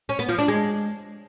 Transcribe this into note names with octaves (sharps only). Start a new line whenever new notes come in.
C#4
B3
F3
D4
G#3